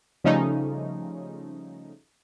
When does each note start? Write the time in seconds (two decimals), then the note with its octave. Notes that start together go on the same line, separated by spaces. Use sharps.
0.24 C#3 F3 G3 A3 C#4 D#4